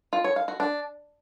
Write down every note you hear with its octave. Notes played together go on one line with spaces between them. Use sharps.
F4
C#5
F5
F#4
D4